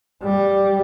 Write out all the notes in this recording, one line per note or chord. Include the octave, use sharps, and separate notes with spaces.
G3